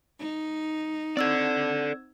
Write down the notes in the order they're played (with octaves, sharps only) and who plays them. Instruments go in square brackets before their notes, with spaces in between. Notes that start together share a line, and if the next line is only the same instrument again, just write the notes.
[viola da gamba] D#4
[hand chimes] C4 E6 G#6 [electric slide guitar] A4 D5